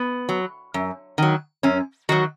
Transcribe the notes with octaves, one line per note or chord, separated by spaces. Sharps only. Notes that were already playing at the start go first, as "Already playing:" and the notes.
Already playing: B3
F#3
F#2
D#3 F#3
F#2 C#4
D#3 F#3 F#4